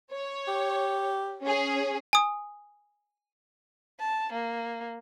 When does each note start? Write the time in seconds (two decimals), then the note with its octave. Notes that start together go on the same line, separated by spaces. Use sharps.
0.12 C#5
0.48 G4
1.42 C#4 G#4
2.13 G#5 D#6
4.00 A5
4.33 A#3